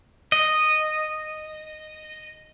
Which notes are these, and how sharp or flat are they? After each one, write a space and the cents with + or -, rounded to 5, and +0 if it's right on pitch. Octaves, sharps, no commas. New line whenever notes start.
D#5 -10